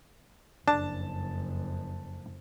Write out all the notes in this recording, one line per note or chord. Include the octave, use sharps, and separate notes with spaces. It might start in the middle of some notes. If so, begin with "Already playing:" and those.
F#1 F2 D4 A5